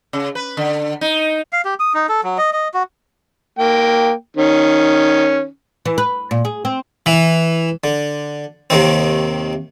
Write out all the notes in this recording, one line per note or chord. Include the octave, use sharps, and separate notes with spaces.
C#3
B4
D3
D#4
F5
G4
D#6
D#4
A4
F#3
D#5
D#5
F#4
A#3 G5
D#3 C#4
E3
B4
A#2
G#4
C4
E3
D3
D#2 C3 D#3 C4